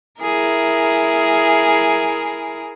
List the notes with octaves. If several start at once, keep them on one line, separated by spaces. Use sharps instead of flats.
E4 G#4 A#4